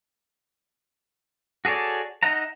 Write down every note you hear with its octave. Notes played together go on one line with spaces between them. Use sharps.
F#4 G#4 A4 C#5 D5
D#4 D#5 E5 F#5 A#5